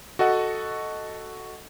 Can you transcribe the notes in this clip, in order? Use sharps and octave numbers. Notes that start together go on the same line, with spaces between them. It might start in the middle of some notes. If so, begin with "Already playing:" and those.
F#4 A4 D#5 F#5